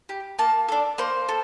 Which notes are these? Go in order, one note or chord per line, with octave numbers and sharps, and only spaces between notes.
G4
A#3 A5
D4 A4
A#3 C5
A4